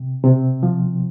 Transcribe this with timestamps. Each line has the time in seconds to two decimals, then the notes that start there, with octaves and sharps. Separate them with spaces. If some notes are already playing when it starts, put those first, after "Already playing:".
Already playing: C3
0.24 C3
0.63 F3